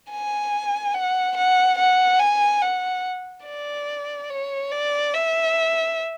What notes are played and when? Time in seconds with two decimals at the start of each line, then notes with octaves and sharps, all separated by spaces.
0.10 G#5
0.94 F#5
1.36 F#5
1.78 F#5
2.20 G#5
2.62 F#5
3.46 D5
4.30 C#5
4.71 D5
5.14 E5